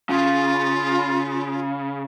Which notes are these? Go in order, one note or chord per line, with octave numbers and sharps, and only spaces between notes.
C#3 F4